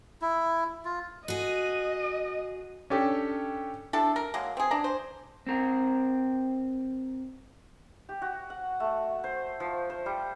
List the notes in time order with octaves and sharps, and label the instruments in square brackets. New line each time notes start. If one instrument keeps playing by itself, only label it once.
[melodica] E4
F4
[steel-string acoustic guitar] F#4 G#4 [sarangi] D#5
[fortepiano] C#4 D4 G4 A4
[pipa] D4 E4 G4 A4
A#4
F#3 G#3 A#3
C4 G#4
D4 A#5
C5
[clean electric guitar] C4 A#4
[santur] G4
F#4
F#5
A3
C5
F3
C5
G3